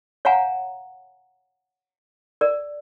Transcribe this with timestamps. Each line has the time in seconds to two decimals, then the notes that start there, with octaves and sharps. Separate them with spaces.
0.25 C#5 F5 F#5 G#5 A#5
2.41 A#4 D5